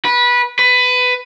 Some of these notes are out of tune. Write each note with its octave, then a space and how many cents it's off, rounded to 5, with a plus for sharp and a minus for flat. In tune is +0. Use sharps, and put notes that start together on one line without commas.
B4 -20
B4 +15